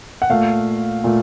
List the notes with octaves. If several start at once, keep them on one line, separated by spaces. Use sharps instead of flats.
F#5
A#2 A3 F5
A#2 A3